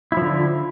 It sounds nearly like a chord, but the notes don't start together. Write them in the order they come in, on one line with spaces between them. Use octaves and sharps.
E4 F3 D3